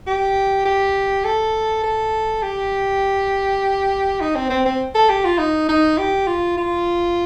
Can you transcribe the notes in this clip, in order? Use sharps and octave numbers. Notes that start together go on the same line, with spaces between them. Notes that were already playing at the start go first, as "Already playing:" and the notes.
G4
G4
A4
A4
G4
D#4
C4
C4
C4
A4
G4
F4
D#4
D#4
G4
F4
F4